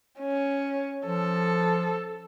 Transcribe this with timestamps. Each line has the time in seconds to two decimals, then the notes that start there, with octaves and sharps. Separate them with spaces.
0.20 C#4
1.06 F3 A4